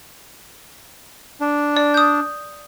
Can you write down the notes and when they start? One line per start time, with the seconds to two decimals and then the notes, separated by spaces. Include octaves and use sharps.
1.40 D4
1.77 D5
1.94 D#6 G6